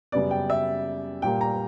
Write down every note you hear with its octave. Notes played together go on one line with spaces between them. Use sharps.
F#2 C#3 G3 B3 D5
G5
E5
A#2 G3 A#3 G5
A#5